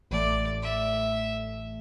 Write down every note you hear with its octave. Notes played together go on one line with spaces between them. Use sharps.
A1 A2 E3 A3 D5
E5